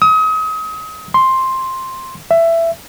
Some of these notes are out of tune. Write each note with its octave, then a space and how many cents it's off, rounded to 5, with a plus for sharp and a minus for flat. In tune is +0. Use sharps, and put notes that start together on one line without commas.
D#6 +35
C6 +5
E5 +15